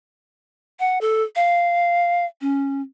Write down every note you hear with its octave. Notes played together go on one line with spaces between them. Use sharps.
F#5
A4
F5
C#4